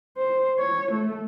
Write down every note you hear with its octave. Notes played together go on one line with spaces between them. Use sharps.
C5
C#5
A3